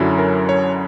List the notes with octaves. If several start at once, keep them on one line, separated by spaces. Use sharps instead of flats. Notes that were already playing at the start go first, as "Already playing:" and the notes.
Already playing: F#2 D3 F#3 C#4 E4
A#4
C#5